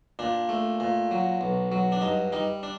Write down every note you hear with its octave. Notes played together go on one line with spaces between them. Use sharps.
A#2 D4
A3
A#2
F#3
B1
F#3
D4
G2 D#4
G3 D#4
D4